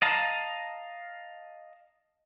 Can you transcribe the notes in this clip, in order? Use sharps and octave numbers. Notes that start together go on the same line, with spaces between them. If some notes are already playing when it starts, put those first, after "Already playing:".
D#5 F5 A5 A#5